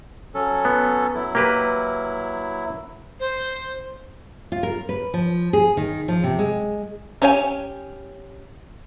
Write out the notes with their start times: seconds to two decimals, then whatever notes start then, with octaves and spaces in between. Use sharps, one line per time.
0.35 F#3 C#4 A4
0.65 B3
1.15 F#3 E4
1.35 A#3 G4 B4
3.20 C5
4.52 F4
4.63 A#4
4.89 B4
5.14 F3
5.53 G#4
5.77 D#3
6.08 F3
6.24 C3
6.39 G#3
7.22 C#4 G4 C#5 E5 G#5